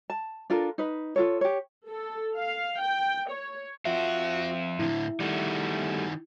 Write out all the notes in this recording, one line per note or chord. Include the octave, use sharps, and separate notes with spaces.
A5
D4 F4 A4 A#4
D#4 B4
F4 A4 C#5
G4 C#5
A4
F5
G5
C#5
F3 C4 F4 F#4 E5
A2 D3 E4
D#3 G3 A3 F#4